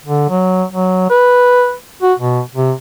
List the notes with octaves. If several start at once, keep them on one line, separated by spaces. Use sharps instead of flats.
D3
F#3
F#3
B4
F#4
B2
C3